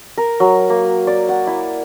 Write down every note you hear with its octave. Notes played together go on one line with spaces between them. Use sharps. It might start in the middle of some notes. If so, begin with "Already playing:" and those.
A#4
F#3
A#3
D5
F#5
E4